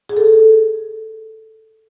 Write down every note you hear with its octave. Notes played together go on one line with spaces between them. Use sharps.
G#4
A4